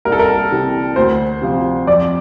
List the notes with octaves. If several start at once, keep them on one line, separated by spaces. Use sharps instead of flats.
C2 A#4
A4
A#4
C3 E3
D2 C5
C3 F3
F2 D5